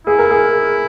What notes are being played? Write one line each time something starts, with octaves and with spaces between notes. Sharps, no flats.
E4 G#4
A#4
G#4